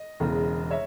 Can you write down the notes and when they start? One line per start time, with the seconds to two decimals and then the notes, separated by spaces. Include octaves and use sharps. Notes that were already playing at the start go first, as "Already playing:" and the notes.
Already playing: D#5
0.20 E1 E2 C#3
0.71 C#5 E5